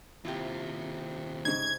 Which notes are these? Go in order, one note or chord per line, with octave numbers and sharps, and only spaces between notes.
D#2 C3 E4 F4
G#2 C#3 G#6